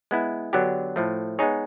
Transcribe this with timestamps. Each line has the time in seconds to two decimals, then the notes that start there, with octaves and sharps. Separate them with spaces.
0.11 G#3 B3 E4
0.53 D3 F#3 B3 D4 G4
0.96 A2 F3 A3
1.39 G#3 B3 D#4 G#4 C#5